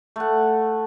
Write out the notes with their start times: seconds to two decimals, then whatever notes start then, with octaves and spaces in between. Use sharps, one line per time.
0.16 A3 F#5